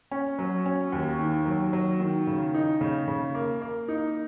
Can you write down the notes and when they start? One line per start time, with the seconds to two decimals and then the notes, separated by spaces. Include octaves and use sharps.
0.11 C#4
0.39 F#3
0.66 C#4
0.92 D#2
1.19 D#3
1.46 F#3
1.73 F#3
2.00 D#3
2.27 C#3
2.54 D#4
2.81 C#3
3.08 C#3
3.35 A#3
3.62 A#3
3.88 D#4